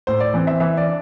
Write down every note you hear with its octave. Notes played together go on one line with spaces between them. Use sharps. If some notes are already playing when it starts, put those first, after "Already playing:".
A2 C5
D5
E3 C4
E5
E3 E5
D5
D4